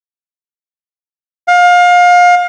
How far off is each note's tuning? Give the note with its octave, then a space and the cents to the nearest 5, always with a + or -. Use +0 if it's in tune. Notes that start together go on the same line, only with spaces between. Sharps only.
F5 +30